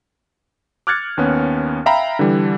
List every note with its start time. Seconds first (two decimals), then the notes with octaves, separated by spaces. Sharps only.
0.87 D6 F6 F#6 G#6 A6 C#7
1.17 D#2 B3 C#4
1.86 E5 F5 G5 A#5 B5
2.19 D3 E3 G3